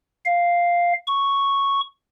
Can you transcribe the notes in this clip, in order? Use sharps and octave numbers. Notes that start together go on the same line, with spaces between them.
F5
C#6